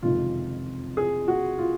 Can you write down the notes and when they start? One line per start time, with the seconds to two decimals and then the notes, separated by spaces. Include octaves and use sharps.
0.03 F#1 F2 C3 D#3 G#3 F4
0.97 G#4
1.28 F#4
1.59 F4